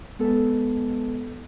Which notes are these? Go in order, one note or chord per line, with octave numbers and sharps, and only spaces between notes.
G#3 B3 A4